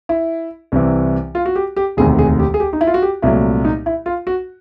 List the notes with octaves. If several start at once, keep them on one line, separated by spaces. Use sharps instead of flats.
E4
C2 C3 E3
F4
F#4
G4
G4
E1 D2 C3 D#3 G#4
G#4
G4
G#4
G4
D#4
E4
F4
F#4
G4
C2 A#2 F#3 A3 E4
D#4
E4
F4
F#4